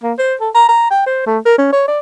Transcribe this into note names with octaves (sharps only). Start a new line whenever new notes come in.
A#3
C5
A4
A#5
A#5
G5
C5
A3
A#4
C#4
C#5
D5